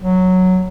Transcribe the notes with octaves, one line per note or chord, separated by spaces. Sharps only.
F#3